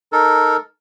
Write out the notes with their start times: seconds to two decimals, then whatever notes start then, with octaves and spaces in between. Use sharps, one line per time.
0.12 D#4 A4 A#4